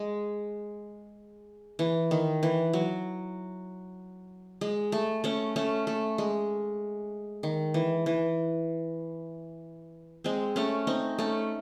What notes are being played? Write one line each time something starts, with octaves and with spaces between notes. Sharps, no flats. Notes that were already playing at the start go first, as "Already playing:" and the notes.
Already playing: G#3
E3
D#3
E3
F#3
G#3
A3
A3 C#4
A3 C#4
A3
G#3
D#3
E3
E3
G#3 C4
A3 C#4
C4 D#4
A3 C#4